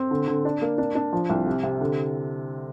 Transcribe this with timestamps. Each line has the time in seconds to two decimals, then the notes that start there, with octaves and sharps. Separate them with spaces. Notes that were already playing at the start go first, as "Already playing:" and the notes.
Already playing: C4
0.11 D3
0.28 D3
0.45 D4
0.62 A#3
0.78 D4
0.95 D4
1.13 F3
1.29 C2
1.46 C3
1.64 C3
1.81 D3